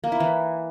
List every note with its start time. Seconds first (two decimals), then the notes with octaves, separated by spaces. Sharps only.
0.04 A#3
0.12 E4
0.20 E3